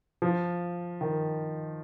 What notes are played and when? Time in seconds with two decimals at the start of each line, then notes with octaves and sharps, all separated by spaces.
0.22 F3
1.01 D#3